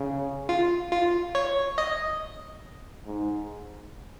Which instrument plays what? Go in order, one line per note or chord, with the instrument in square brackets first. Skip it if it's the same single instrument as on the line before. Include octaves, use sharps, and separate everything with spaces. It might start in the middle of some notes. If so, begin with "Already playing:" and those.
Already playing: [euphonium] C#3
[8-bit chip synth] F4
F4
C#5
D#5
[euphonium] G#2